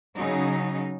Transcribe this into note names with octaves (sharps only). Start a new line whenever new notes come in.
C#3 F#3 D#4